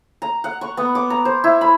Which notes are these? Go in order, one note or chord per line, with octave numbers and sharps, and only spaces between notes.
A#5
F#5
C#6
B3
D6
A#5
C5
E4
B5